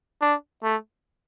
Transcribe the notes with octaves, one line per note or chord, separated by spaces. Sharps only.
D4
A3